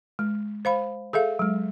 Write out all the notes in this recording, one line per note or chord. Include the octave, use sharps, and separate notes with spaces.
G#3
C5 F5 B5
G#4 A4 E5 F5
F#3 G#3